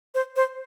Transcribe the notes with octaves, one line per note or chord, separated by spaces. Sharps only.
C5
C5